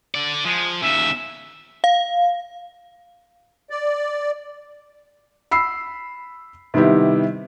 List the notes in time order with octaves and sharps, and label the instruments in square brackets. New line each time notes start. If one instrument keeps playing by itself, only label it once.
[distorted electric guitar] D3 D5
[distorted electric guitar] F3 [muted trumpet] G#3
[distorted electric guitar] D#2 C#3 [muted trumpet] E5
[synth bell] F5
[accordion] D5
[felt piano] B5 E6 C7
C3 D#3 G3 B3 E4 G4